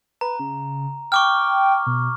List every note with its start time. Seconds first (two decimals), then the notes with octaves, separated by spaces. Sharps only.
0.21 B4 A#5
0.40 C#3
1.12 G5 C#6 D6 F6
1.87 B2